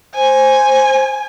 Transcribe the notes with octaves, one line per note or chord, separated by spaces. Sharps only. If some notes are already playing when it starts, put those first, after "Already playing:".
C5 G#5